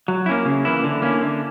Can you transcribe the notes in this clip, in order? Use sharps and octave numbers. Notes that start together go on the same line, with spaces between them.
F#3
A#3 C#4 E4
C#3
E3 A#3 E4
D3
A#3 C#4 E4
D3